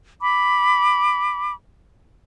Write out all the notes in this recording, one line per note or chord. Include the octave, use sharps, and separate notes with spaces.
B5 D6